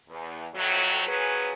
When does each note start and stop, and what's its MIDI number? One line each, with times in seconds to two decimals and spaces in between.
0.10 0.48 40
0.54 1.07 41
0.54 1.07 45
0.54 1.07 54
1.07 1.53 53
1.07 1.53 54
1.07 1.53 61
1.07 1.53 68
1.07 1.53 71